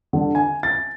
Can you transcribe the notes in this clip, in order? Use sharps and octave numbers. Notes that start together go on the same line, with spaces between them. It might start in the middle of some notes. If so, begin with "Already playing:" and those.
D3
G#5
A6